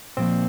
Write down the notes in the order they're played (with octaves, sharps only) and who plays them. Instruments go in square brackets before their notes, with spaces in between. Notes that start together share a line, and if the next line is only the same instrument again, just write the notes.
[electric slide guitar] A#2 F3 A#3 [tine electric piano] C4